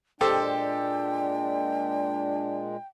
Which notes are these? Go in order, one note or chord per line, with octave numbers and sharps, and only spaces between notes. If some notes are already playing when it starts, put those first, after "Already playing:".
A#2 G#3 D4 G4 A4 C5 G5